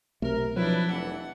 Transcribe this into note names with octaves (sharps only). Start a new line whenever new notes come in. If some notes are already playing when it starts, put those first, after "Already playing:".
B1 C3 A3 A#4
F3 F#3 D4 E4 B4
F1 E3 F#5